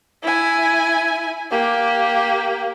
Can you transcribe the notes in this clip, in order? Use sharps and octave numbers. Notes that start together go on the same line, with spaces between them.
E4 G#5
A#3 G4